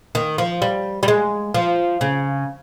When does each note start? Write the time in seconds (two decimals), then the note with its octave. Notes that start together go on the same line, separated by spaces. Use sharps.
0.15 D#3
0.38 F3
0.62 G3
1.03 G3
1.08 G#3
1.54 F3
2.01 C#3